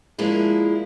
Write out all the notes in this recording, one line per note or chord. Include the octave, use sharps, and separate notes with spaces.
F3 G#3 A#3 D4 E4